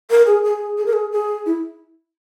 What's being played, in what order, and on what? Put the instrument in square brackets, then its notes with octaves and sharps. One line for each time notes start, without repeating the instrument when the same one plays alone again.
[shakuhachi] A#4
G#4
G#4
G#4
A#4
G#4
G#4
E4